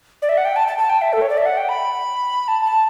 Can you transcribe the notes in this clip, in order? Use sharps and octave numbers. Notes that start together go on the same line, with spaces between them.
D5
E5
F#5
G5
A5
A5
A5
G5
E5
A4
C#5
D5
E5
F#5
G5
B5
A5
A5